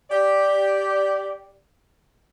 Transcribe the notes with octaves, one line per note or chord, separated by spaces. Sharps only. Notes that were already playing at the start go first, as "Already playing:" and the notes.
G4 D5